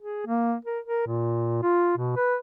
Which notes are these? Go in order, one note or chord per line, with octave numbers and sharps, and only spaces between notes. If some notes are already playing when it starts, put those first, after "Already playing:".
G#4
A#3
A#4
A#4
A#2
F4
B2
B4